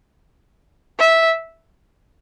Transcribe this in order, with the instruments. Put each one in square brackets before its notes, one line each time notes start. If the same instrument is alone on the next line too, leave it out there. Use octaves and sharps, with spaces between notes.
[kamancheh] E5